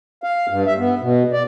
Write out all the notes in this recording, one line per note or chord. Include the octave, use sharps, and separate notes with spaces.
F5
G2
E5
B3
B2
D5